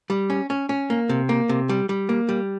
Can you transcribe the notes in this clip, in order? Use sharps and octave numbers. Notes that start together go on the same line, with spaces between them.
G3
C#4
C#4
C#4
A#3
C3
A#3
C3
G3
G3
A#3
G3